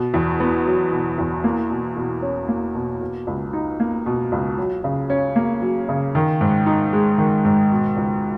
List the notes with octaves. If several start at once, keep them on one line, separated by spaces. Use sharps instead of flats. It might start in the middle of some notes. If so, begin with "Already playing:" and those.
Already playing: B2
E2
B3
F#3
B2
E2
A#3
B2
B2
C#4
A#3
B2
B2
C#2
D#4
A#3
B2
C#2
F#3
C#3
C#4
A#3
F#3
C#3
D#3
G#2
D#4
G#3
D#3
G#2
B2
C#2